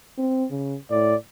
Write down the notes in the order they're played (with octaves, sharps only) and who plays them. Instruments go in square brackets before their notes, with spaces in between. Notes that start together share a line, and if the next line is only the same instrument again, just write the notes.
[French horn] C4
C#3
[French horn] A2 [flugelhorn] D5